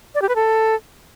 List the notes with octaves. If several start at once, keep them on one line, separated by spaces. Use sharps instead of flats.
D5
G4
B4
A4